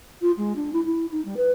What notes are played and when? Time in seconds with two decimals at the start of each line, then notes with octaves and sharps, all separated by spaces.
0.21 F4
0.37 G#3
0.56 D4
0.73 E4
0.85 E4
1.11 D#4
1.25 G3
1.37 B4